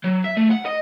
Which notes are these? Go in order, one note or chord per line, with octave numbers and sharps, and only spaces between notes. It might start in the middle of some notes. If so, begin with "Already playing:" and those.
F#3
E5
A3
F#5
D#5